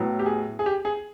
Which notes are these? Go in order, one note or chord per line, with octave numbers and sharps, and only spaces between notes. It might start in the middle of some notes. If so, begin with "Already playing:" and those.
Already playing: A2 F#3 B3
G4
G#4
G#4
G4
G#4